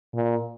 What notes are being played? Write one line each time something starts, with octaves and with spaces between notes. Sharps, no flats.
A#2